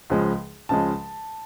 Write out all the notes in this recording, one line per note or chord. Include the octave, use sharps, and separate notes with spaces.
C#2 C#3 F3 G#3
C#2 C#3 F3 G#3 A5